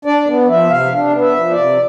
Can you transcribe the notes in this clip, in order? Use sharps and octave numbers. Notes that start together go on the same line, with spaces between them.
D4 D5
B3
F3 E5
C3 F5
D4
B3
E5
F3
D5
C3